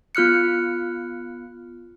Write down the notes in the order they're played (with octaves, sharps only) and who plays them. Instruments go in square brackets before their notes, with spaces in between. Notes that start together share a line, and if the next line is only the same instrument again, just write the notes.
[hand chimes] B3 F4 F6 F#6 C#7